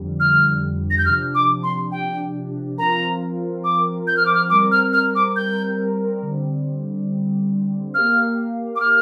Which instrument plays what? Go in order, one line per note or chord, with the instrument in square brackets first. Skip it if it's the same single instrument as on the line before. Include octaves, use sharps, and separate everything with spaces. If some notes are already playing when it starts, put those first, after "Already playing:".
Already playing: [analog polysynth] F2 D3 G3
[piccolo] F6
A#6
G6
[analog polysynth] C3 F3 D4 G4 [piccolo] F6
[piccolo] D6
C6
G5
[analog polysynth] F3 C4 F4 A#4 [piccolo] A#5
[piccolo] D6
G6
F6
D6
F6
[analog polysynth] G3 C4 A#4 [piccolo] D6
[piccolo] F6
F6
D6
G6
[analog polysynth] D3 G3 C4
[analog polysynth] A#3 G4 A#4 F5 [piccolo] F6
[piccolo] D6
F6